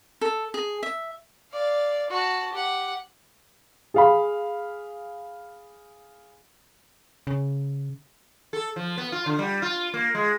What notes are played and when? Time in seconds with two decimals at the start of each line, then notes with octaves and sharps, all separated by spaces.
0.21 A4
0.54 G#4
0.83 E5
1.52 D5 F5
2.10 F#4 A5
2.53 G4 F#5
3.94 G#4 F5 B5
7.27 C#3
8.53 A4
8.76 F3
8.98 B3
9.12 F4
9.26 D3
9.39 G3
9.62 F4
9.94 A#3
10.15 G#3